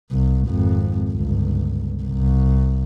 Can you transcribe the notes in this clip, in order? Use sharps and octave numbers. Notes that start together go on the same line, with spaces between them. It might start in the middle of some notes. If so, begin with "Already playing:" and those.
C2
G#1 F2
G1 C#2
C2